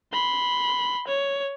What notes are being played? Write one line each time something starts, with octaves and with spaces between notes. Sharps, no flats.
B5 C6
C#5